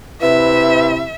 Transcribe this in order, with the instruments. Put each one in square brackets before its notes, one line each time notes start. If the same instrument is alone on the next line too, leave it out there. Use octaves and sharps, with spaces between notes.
[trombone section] C3 E4 [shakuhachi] B4 [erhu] E5